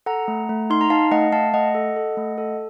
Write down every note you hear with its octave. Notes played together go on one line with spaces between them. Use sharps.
A4 F#5 A#5
A3
A3
D#4 C6
A#5
D#4 F5 A5
A3 D#5 F#5
A3 F5 A5
A3 D#5 F#5
A4
A4
A3
A4